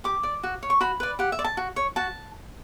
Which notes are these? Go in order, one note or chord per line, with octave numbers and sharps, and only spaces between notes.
G4 D6
D5
F#4
C#5
C#6
F#4 B5
B4 D5
G4 F#5
E5
D5
A5
F#4
C#5
F#4 A5